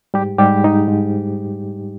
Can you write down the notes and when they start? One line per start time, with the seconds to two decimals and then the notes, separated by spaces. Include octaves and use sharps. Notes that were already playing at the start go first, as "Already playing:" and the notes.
0.14 G#2 G3 G4
0.38 G#2 G3 G4
0.63 G#2 D#4
0.88 G#2